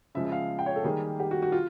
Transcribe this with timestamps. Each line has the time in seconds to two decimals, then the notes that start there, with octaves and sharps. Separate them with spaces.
0.15 C#3 F3 G#3 E5
0.25 E5
0.32 F5
0.59 G5
0.66 C#5
0.76 A4
0.84 D#3 G3 A#3 G#4
1.20 G4
1.31 F#4
1.42 F#4
1.52 F4